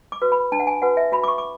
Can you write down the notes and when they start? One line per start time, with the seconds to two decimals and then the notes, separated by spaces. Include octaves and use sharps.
0.12 D6
0.22 F#4 B4
0.32 B5
0.52 D4 A5
0.60 F#5
0.67 G#5
0.82 F#4 B4 F#5
0.97 E5
1.12 F#4 B5
1.24 D6
1.28 C#6
1.38 D6